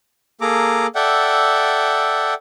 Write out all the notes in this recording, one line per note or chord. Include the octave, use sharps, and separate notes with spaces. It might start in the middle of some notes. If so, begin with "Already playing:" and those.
A#3 G#4 A4 A#5 D6
A4 D5 E5 F#5 G5